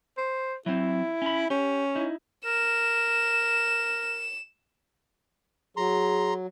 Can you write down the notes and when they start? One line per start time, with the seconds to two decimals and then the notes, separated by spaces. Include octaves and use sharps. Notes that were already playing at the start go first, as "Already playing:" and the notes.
0.18 C5
0.66 F#3 C4 E4
1.22 C#4 B5
1.50 C#4 G4
1.95 D#4 E4
2.46 A#4 E7
5.77 F#3 G#4 A#5 C6